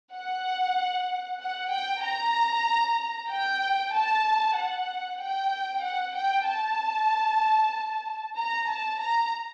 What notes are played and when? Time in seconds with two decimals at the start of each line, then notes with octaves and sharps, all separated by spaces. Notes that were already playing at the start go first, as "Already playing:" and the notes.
0.13 F#5
1.40 F#5
1.71 G5
2.03 A#5
3.29 G5
3.93 A5
4.56 F#5
5.20 G5
5.84 F#5
6.15 G5
6.47 A5
8.36 A#5
8.68 A5
9.00 A#5